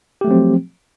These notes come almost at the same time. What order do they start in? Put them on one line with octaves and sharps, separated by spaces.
G4 A3 F#3 C4 F3